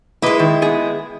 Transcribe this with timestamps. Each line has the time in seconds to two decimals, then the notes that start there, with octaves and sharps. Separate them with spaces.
0.22 G#3 A#3 E4 B4 D#5
0.40 D#3
0.62 B3 G#4